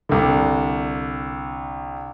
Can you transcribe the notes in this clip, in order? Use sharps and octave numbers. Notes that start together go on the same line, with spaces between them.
C2 D3